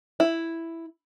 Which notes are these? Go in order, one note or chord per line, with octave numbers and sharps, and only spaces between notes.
E4